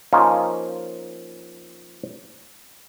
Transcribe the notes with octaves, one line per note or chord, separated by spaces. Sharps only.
F3 A#3 C#4 D#4 F4